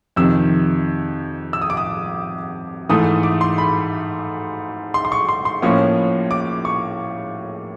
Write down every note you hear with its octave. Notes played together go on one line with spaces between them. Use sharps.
F2 C3 D#3 E6
E6
D#6
D6
D#6
G#2 E3 A3 D#6
D6
C6
B5
C6
C6
C#6
C6
C6
A2 F3 A#3 C#4 C#6
D6
C#6